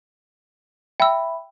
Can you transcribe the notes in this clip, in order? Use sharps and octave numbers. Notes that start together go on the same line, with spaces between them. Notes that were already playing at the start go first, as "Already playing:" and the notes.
E5 G5 B5 E6